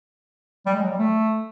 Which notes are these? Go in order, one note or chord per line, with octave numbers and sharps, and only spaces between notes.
G3
G#3
F#3
G3
A3